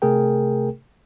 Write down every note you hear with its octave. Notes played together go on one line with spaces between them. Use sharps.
C3 A3 G#4 A#4 G5